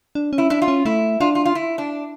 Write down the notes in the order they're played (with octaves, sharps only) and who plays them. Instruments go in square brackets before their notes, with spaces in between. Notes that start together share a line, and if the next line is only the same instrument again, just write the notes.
[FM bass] D4
C#4
[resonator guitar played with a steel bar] E4
[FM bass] D4 [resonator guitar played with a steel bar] E4
[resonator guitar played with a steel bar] F4
[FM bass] C#4
[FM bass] A3 [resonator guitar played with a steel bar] E4
[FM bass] D4 [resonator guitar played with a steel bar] F4
[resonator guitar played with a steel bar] F4
F4
E4
D4